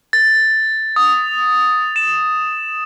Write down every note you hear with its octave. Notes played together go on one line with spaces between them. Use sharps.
A6
D#6
E7